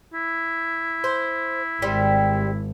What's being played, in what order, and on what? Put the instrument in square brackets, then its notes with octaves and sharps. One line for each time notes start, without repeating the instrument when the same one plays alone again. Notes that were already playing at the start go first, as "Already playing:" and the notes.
[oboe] E4
[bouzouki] C5
[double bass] G#1 [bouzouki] G3 C4